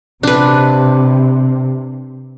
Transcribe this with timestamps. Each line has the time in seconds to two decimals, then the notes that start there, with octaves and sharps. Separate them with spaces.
0.23 C3 D4 B4